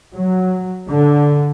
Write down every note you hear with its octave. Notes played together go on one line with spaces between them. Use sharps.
F#3
D3